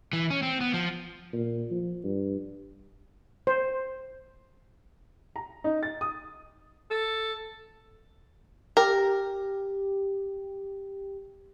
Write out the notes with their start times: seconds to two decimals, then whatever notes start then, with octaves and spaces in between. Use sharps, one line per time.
0.13 E3
0.30 C#4
0.43 C4
0.61 B3
0.74 F3
1.33 A#2
1.71 F3
2.04 G2
3.47 C5
5.36 A#5
5.64 D#4
5.83 A6
6.01 D#6
6.91 A4
8.77 G4 A#4